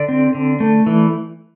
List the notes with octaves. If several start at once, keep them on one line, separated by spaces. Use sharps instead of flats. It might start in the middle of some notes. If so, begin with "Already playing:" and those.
Already playing: D3 D5
C4
D3
A3
E3